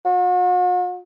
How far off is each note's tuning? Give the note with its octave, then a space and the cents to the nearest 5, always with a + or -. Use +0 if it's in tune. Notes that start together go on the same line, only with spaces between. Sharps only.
F#4 -45